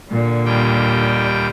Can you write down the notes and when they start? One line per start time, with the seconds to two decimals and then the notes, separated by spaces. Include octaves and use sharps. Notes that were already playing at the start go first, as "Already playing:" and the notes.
0.10 A#2 D3
0.45 D#2 G3 G5